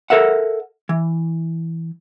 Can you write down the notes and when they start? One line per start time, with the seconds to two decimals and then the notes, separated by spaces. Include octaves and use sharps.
0.10 A4 A#4 E5 F#5
0.89 E3